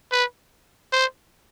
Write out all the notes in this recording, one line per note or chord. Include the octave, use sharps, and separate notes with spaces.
B4
C5